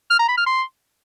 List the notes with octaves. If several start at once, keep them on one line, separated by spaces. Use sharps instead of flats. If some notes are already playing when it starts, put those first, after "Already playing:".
F6
A#5
B5
F6
C6